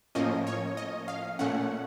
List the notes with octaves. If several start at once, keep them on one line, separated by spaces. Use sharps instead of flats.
A2 F3 A#3 C#4 D#5
C#5
D#5
F5
A#2 A3 C#4 F#5